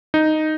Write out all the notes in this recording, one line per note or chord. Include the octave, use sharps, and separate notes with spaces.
D#4